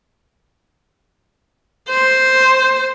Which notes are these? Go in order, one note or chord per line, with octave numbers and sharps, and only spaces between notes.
C5